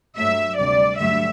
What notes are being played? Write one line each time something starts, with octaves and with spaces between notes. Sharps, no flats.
G2 F#3 A3 E5
D2 C3 G3 D5
G2 D3 F#3 A3 E5